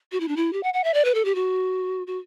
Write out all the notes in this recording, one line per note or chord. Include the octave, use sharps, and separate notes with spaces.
F#4
E4
D4
E4
G4
F#5
F#5
E5
D5
B4
A4
G4
F#4
F#4